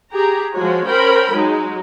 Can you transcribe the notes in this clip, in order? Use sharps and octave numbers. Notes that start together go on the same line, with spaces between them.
G4 G#4 A#5
F3 G#3 F#4 C#5
C#4 A#4 C5 G5 B5
F#3 G#3 D#4